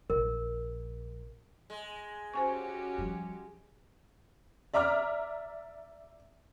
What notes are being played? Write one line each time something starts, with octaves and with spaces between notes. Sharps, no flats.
A#1 A#4
G#3
C#4 F#4 G4 C5 G#5 C#6
F3 G3
D5 E5 A#5 D6 F6